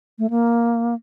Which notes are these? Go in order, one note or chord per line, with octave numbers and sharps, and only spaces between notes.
A3
A#3